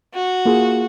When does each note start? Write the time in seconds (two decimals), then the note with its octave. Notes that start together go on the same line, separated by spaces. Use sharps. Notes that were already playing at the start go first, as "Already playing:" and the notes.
0.14 F#4
0.45 A#3 F4 G#4